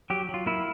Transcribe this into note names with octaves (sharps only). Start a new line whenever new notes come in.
F#3 G4
F#3
F4
A#3 E4